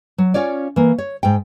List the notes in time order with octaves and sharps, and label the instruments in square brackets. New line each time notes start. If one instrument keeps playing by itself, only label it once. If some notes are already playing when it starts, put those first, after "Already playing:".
[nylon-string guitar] F#3
C#4 F4 C#5 D5
E3 A#3
C#5
G#2 G5